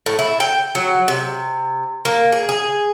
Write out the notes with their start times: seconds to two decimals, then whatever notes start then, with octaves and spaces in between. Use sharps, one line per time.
0.06 A2
0.19 E4
0.40 G5
0.75 F#3
1.08 C3
2.05 A#3
2.32 G#4
2.49 G#4